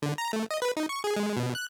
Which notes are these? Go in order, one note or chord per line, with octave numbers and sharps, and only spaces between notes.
D3
A#5
A3
D#5
B4
D#4
C#6
G#4
G#3
B2
F#6